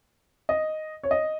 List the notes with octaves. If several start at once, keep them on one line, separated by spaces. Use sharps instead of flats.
D#5
C#5
D#5